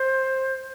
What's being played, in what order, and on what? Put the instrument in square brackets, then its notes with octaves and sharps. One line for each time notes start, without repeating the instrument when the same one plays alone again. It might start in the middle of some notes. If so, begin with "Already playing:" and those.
Already playing: [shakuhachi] C5